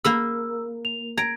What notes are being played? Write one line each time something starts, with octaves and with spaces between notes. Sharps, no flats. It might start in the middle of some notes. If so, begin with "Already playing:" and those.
A#3 A#4 B5 E6
F7
A#5 G#6 D7